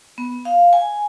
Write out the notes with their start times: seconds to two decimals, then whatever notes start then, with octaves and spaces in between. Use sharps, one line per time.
0.18 B3
0.45 F5
0.73 G#5